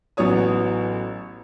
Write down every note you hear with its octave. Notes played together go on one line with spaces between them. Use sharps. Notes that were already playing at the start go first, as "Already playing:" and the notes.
A1 F#3 B3 C#5 D#6